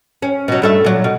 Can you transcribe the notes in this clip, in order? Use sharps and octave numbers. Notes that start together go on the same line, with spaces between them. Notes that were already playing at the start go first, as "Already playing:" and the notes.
C#4
B2 F#3
G2 A3 E5
A#2 F#3
B2